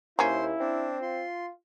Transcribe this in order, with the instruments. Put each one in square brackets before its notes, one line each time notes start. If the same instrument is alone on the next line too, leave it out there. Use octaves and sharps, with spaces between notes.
[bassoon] D#2 [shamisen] A#3 C#4 [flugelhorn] E4 [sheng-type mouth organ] C5 C6
[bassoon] C4 [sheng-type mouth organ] D4
[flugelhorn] F4 [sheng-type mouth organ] C6